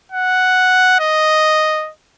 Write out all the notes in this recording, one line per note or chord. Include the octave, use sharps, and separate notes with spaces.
F#5
D#5